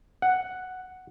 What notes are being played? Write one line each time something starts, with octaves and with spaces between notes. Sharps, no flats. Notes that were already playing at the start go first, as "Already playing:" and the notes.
F#5